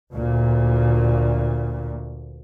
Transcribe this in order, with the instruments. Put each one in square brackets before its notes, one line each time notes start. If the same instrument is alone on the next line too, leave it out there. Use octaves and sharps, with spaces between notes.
[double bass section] D2 A#2